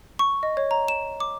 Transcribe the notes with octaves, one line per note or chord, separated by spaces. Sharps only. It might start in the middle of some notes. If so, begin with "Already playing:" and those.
C#6
D#5
C#5
A#5
E7
D6